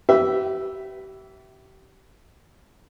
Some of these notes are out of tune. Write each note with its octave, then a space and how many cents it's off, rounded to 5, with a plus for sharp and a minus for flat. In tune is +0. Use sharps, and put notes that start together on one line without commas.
G4 -35 B4 +0 E5 +0